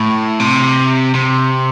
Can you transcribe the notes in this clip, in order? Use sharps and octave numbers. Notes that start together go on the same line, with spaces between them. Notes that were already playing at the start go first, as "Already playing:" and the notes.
Already playing: A2
C3
C3